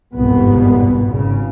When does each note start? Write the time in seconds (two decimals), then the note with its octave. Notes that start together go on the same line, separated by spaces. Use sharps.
0.14 G1 C2 F2 G#2 B2 B3
1.05 G#1 C#3